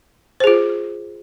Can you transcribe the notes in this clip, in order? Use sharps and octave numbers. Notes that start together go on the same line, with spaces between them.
F4 G#4 C5